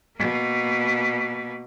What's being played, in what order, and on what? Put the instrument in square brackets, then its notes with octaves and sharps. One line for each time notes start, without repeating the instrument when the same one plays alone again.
[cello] B2 A#3